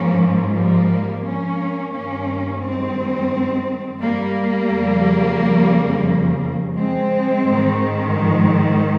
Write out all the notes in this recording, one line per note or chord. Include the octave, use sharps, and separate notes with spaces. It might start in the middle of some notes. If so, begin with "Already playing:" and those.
Already playing: G#2 F3 A#3 C#4
G3 A#3
A#3 C#4
G2 D#3 A#3 C#4
G#3 C4
G3 A#3
F2 C#3 F3
G#3 C4
G#2 D#3
F3 G#3